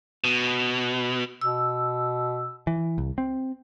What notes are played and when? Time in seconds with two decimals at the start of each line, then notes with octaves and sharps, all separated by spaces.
0.24 B2
1.41 B2 E6
2.67 E3
2.98 C2
3.18 C4